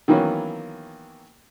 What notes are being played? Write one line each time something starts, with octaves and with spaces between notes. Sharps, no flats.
D#3 E3 F#3 A#3 B3 C#4